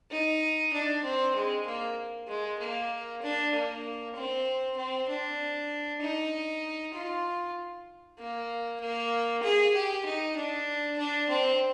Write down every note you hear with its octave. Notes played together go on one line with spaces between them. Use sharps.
D#4
D4
C4
G#3
A#3
G#3
A#3
D4
A#3
C4
C4
D4
D#4
F4
A#3
A#3
G#4
G4
D#4
D4
D4
C4